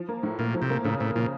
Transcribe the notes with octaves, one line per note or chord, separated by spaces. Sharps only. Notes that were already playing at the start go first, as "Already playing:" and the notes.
Already playing: F3
A#3
A2
A#2 A#3
F3
C3
A#3
A2 C#3
A2 C4
A#2 F3